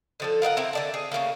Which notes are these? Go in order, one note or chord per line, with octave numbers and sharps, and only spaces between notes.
D3 F3 A4
F4 A#4 D#5 F#5
C4 E4 A#4
D3 D5 A5
G#4
C#3 G3 A3 A#3